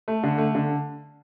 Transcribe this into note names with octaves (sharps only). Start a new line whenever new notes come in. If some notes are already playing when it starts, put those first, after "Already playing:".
A3
D3
A3
D3